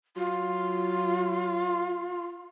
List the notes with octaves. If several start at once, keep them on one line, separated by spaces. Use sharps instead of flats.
F#3 F4